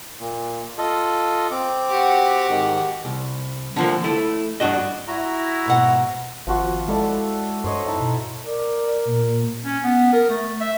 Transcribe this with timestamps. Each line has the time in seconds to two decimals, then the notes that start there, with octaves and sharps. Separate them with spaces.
0.20 A#2
0.78 F4 A4 D#5
1.51 C4 D6
1.89 F#4 G4
2.49 G#2 D#3
3.05 C2
3.76 D3 F3 A#3
4.04 A3 E4
4.60 G2 D4 F#4 D#5
5.08 E4 F#4 A#5
5.66 G#2 B2 F#5
6.47 G#1 F3 F4 F#4
6.88 G#3 E4 A4 D5
7.64 G2 C5 C#5 D#5
7.86 D#4 E4 A5
8.00 B2
8.46 A#4 D5
9.05 A#2
9.64 C#4
9.83 B3
10.13 A#4
10.29 A3
10.60 E5